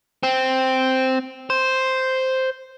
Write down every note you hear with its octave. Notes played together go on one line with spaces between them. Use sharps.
C4
C5